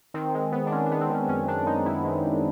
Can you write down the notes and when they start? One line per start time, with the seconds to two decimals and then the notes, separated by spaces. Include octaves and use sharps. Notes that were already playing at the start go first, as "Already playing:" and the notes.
0.14 D#3 C4
0.34 G#3
0.52 B3
0.67 D4
0.72 G#3 C#4
0.86 D4
0.91 B3
1.01 C4
1.09 D#3 C#4
1.28 F#2 C#4
1.48 D#3 D4
1.67 G#3 D#4
1.86 B3 E4
2.05 G#3
2.24 F#2